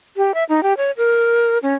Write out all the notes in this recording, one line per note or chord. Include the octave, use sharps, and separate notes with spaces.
G4
E5
D#4
G4
C#5
A#4
C#4